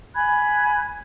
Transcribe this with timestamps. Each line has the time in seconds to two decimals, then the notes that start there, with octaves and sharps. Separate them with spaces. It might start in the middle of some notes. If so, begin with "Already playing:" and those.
0.15 G#5 B5 F#6 G#6